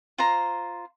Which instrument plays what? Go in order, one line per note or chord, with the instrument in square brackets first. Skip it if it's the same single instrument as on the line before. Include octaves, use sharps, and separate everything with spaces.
[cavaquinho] F4 C5 A#5